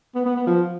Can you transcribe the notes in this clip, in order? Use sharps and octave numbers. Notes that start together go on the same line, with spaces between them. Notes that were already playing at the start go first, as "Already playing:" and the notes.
B3
B3
B3
F3